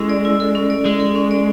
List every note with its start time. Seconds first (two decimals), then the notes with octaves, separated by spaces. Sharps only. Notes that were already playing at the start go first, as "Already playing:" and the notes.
Already playing: G#3 C#4 E4 A4
0.09 D5
0.25 E4
0.40 A4
0.55 C#4
0.70 D5
0.85 G#3 E4
1.00 A4
1.16 C#4
1.31 D5